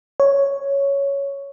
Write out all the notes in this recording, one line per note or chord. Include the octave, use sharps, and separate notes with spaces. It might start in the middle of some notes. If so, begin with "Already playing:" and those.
C#5